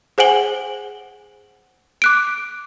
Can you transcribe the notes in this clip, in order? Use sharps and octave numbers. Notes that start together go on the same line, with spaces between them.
G#4 C5 F#5 G#5 F#7 G7
D6 F#6 D7